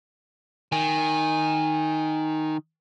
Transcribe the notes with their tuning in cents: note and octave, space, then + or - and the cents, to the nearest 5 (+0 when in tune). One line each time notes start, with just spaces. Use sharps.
D#3 +0 G#5 -15